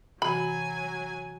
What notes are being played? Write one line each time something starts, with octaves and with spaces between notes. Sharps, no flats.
C3 E3 F#3 F#4 G#5 B5